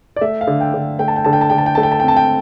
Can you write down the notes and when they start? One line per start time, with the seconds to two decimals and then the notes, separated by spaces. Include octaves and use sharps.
0.16 D5
0.21 A3 E5
0.41 F5
0.47 D3
0.61 G5
0.74 D3
0.99 A3 G5
1.08 A5
1.16 G5
1.25 D3 A5
1.33 G5
1.41 A5
1.50 D3 G5
1.58 A5
1.66 G5
1.75 A3 A5
1.83 G5
1.92 A5
2.00 G5
2.03 C4 A5
2.17 G5